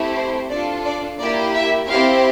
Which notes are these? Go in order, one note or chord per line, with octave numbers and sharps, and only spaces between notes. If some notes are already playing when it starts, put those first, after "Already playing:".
Already playing: A3 C4 E4 G4
C5
D4 F4 A4 D5
D5
A#3 E4 G4 D5
E5
C4 E4 G4 F5